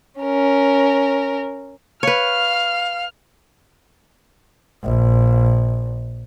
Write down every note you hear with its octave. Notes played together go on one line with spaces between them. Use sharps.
C#4 A#4
B4 C#5 F5 F6
A#1